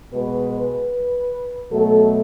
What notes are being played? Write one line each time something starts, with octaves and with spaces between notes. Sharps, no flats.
B2 G#3 B4
B4
B2 F#3 A3 A4